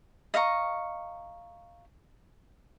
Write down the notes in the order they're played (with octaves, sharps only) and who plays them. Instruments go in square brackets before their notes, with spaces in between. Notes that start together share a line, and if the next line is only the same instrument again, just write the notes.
[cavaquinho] D#5 F5 A#5 C#6